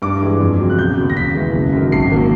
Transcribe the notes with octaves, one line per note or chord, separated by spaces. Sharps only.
G2 D6
E3 G#3
F2
C#3 F#3
F#6
E1 G6
D#2 C#3 F#3
A#6
D#2 B6
C#3 E3 G#3
F#1
F#2 D#3
G#1 C7
D#3 F#3 A#3